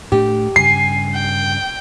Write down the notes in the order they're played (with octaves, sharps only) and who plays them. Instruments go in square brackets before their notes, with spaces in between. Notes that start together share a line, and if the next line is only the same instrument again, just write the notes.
[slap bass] A2 A3 D4 [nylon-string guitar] G4
[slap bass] G2 C#3 [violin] G#5 [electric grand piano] C7
[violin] G5